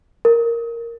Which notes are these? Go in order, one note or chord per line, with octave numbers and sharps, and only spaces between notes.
A#4